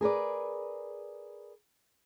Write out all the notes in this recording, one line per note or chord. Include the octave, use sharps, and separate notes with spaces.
G#4 A#4 B4 D5